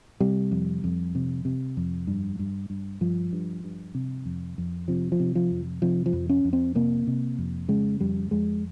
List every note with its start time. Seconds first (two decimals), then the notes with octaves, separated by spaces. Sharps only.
0.21 C3 G3
0.51 F2
0.84 F2
1.15 C3
1.45 C3
1.77 F2
2.07 G2
2.39 G2
2.70 G2
3.01 G2 F3
3.33 G2
3.64 G2
3.95 C3
4.26 F2
4.58 F2
4.88 C3 F3
5.12 F3
5.20 C3
5.35 F3
5.51 F2
5.82 C3 F3
6.06 F3
6.13 F2
6.29 C#4
6.44 F2
6.53 C4
6.75 C3 A#3
7.07 C3
7.38 F2
7.69 C#3 G#3
8.00 F2 G3
8.31 F2 G#3